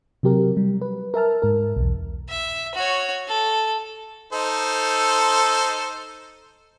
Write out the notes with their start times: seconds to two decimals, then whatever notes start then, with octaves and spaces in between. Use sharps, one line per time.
0.23 C3 F#3 G4 A#4
0.57 G3
0.81 B4
1.14 A#4 E5 A5 F6
1.42 G#2 A#4
1.76 B1 E2
2.29 E5
2.75 F#4 C#5
3.28 A4
4.33 D#4 A4 C5